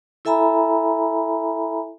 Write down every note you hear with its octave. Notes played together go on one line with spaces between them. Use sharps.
E4 A4 E5 G#5 A#5 B5